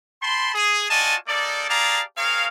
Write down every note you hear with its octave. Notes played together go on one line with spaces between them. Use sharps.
G5 A5 B5 C6
G#4
F4 F#4 D5 D#5 G#5 A5
A#3 D#4 A4 D5
G4 G#4 D5 F5 A5 A#5
C4 G#4 A#4 C#5 F5